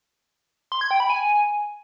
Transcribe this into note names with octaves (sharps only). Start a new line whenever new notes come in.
C6
G#6
G5
B5
G#5